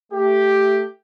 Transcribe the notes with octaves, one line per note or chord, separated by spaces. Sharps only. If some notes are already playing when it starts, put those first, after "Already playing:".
A3 G4